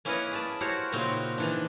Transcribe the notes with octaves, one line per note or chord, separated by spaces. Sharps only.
A#3 C#4 E4 B4 C#5 D#5
G#4 D5 A5
E4 F#4 G4 A#4 C5 C#5
A#2 C#3 A#3 C4 D#4 F#4
D#3 E3 D4